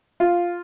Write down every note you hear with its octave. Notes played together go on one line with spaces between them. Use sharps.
F4